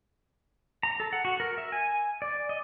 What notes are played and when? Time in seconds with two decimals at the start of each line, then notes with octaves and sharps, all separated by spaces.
0.83 A#5
1.00 A4
1.13 F#5
1.25 F#4
1.40 A#4
1.58 E5
1.72 G#5
2.22 D5
2.49 D#5